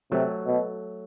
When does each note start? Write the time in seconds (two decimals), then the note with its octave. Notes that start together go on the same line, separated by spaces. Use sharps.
0.11 C3 F#3 A3
0.46 B2